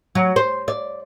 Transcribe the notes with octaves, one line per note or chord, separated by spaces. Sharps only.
F#3
C5
D5